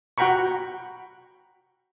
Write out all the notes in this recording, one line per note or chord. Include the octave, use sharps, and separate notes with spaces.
F#4 F#5 G5 A#5 B5 C#6